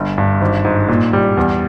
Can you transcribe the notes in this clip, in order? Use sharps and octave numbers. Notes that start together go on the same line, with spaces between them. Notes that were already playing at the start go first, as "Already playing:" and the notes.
Already playing: G1
G2
G#1
G#2
A#2
G3
E2